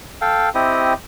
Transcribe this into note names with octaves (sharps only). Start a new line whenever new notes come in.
A4 F5 G5
C4 E4 G4 D#5